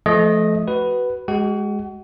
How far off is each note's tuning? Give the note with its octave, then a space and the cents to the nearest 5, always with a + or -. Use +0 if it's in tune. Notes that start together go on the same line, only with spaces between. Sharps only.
F3 -30 A3 -30 D#5 +0
F#4 +20 B4 +0
G#3 +0 F#4 +35 F#5 +35